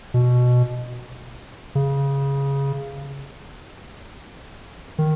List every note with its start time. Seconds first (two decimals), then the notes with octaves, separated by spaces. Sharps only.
0.14 B2
1.75 C#3
4.99 D#3